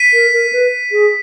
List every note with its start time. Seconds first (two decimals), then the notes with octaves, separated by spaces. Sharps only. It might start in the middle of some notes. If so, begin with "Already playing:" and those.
Already playing: B6 D#7
0.13 A#4
0.33 A#4
0.53 B4
0.92 G#4